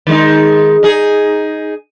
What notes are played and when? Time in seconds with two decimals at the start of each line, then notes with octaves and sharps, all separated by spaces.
0.07 D#3 G#3 D#4
0.83 D#4 G#4